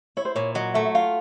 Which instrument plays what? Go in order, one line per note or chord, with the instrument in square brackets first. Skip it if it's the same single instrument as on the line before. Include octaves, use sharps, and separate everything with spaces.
[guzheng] E4 [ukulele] C#5
[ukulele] C5
[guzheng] A#2 [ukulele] C#5
[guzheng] F#3 [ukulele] D#5
[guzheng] A3 [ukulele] E5
[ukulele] E5
[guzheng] F4 [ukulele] F5